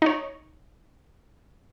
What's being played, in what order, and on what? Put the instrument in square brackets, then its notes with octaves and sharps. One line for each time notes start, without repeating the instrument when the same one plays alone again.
[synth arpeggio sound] D#4 C#5